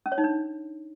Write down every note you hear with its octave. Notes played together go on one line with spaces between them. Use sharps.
C#4
C#5
D#4
D4